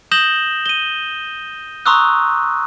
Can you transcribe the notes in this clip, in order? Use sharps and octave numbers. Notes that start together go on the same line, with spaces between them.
D#6 G6 A#6 E7 F#7 G7
D#7 G7
A#5 C6 C#6 D#6 E6 F#6